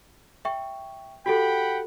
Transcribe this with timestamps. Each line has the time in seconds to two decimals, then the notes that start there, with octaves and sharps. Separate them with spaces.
0.45 E5 G5 C#6
1.26 F#4 G4 A4 F#5 G5 B5